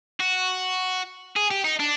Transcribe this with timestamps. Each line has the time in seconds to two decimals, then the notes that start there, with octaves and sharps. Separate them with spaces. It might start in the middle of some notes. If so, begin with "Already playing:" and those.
0.20 F#4
1.36 G#4
1.51 G4
1.65 D#4
1.80 D4